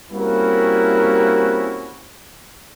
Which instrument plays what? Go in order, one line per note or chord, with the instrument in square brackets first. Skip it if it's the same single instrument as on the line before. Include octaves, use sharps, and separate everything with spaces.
[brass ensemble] G3 A#3 C4 C#4 E4 F#4